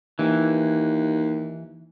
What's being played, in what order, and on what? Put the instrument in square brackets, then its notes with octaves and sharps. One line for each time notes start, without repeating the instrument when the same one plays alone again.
[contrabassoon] D#2 [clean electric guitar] E3